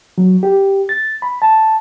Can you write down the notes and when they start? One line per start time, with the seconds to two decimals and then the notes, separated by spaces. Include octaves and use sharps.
0.18 F#3
0.43 G4
0.89 A6
1.22 B5
1.42 A5